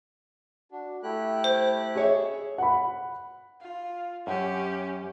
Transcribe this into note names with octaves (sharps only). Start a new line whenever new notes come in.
D4 F#4
A3 E4 G4 F#6
C5
G#4 C#5 E5
F#5 B5
F4
F#2 C#4 G4